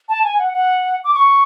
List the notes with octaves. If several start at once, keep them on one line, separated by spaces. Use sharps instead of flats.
A5
G#5
F#5
F#5
D6
C#6